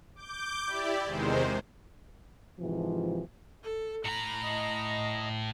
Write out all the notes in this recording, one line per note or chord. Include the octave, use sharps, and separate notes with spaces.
D6 G6
E4 G4 D5
E2 C3 D#3 G#3 C5
G#2 C3 E3 F3
A4
A2 A#5 B5
D#5